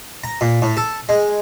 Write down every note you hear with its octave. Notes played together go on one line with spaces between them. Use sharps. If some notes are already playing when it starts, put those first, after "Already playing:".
A#5
A#2
A2
A4
G#3